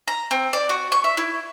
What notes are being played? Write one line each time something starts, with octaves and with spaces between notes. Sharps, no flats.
A#5
C4
D5
F#4
C#6
E5
E4